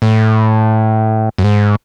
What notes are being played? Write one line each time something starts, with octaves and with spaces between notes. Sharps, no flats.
A2
F#2
G#2